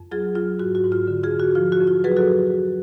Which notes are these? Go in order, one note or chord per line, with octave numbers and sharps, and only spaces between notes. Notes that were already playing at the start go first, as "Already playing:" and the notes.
Already playing: F2
F#3 F4 G#4
F#3 F4
G#2 F#4
F#4
G#2
F4
D3
F4 G#4
F2
F#4
F3 F4
F#4
F2
F4
F#3 G#4 B4
F#4 A4